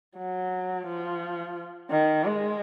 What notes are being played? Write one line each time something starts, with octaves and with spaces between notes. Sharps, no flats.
F#3
F3
D#3
G#3